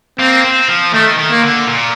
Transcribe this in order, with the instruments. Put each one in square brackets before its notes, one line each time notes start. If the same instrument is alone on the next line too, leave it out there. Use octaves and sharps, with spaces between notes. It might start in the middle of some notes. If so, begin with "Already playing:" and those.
[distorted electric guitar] A#3 [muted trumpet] C4
[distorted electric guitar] C4
F3
[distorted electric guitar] D#3 [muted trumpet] A3
[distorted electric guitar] D#3
[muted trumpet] A#3
[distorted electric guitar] D3
A#2